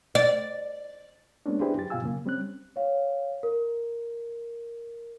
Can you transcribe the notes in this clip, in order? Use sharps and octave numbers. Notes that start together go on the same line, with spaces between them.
D5
G#3 A#3 B3 C#4 D4
D4 E4 G4 G#4 B4 C5
F#2 G4 A6
G2 B2 F4 F5 G#5 E6
F#2 C#3 A#3
G3 C4 C#4 F#6
C#5 F5
A#4